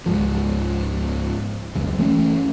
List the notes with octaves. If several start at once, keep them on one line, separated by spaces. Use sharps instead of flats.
C#2 G#2 F3
D#1 C#2 F#2
E3 A3 C4 C#4